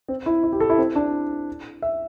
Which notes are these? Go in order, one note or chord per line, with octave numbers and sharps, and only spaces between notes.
C4
E4
E4
G4
A4
E4
C4
D4
E5